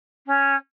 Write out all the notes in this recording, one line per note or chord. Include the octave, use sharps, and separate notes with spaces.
C#4